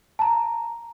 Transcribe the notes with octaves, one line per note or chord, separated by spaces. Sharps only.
A5 A#5